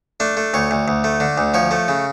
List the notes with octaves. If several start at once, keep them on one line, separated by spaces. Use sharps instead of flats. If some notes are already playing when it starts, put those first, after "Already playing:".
A3 D4
A3
D2 C#5
D2
D2
A3
D3
D2
F3 C#5
A3
C#3